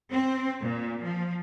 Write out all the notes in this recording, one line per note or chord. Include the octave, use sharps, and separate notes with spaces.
C4
A#2
F3